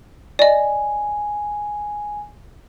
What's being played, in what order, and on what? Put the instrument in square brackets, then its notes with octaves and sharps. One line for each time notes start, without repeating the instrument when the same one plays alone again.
[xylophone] D5 D#5 [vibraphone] G#5